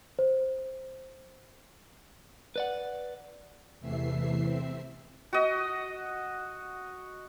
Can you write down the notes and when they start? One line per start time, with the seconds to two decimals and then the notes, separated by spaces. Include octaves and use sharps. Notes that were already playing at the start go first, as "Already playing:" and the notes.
0.19 C5
2.56 B4 D5 F#5
3.80 E2 C3 E3 A3 E5 C7
4.42 C4 E5
5.33 F#4 D#5